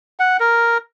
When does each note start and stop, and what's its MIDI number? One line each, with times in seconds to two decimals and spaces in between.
0.19 0.37 78
0.40 0.78 70